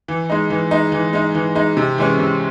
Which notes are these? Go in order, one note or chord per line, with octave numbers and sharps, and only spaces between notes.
E3
G#3 D#4
E3
G#3 D#4
E3
G#3 D#4
E3
G#3 D#4
C3
E3 G#3 C#4
C3